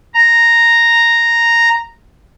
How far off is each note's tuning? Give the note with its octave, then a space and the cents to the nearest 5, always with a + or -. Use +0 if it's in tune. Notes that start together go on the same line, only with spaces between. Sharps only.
A#5 -5